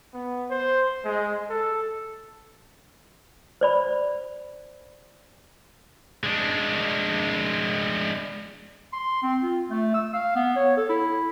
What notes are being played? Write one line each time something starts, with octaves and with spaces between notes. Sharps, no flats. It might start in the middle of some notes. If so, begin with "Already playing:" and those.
B3
C5
G#3
A4
C5 D5 B5
G#3 D4
C6
C4
F4
A3
E6
F5
B3
C#5
A4
E4